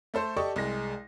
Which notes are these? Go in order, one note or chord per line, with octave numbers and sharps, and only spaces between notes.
A3 A4 C5
G4 A4 D5 D#5 A5 C#6
C2 G#3 A#6